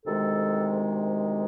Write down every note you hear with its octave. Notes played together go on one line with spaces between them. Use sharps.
D2 C3 D#3 G#3 A4